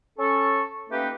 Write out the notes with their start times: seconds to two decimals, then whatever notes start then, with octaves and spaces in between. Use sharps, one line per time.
0.19 C#4 A4 C#6
0.90 A3 A#3 C#4 D#4 G4 B4